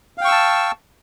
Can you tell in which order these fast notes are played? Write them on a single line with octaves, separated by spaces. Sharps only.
F5 G5 C#6 E6 A5